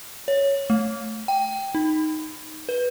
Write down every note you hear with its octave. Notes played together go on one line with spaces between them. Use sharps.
C#5
A3
G5
D#4
B4